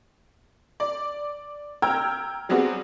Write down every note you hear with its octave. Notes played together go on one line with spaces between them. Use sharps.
D5
G5 A#5 E6 F6 G#6
F#3 G3 B3 C4 F#4 G#4